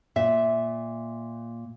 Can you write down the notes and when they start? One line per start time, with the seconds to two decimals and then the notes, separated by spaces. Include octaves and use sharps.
0.16 A#2 E5